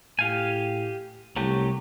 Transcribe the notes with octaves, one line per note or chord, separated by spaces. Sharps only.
A2 G4 F5 G#5
C2 F#3 A3 G4